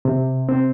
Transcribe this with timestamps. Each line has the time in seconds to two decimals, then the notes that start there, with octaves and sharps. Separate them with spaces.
0.05 C3
0.49 C4